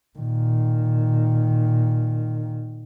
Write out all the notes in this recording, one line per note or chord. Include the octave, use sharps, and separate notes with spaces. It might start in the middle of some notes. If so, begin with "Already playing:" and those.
A#2 D#3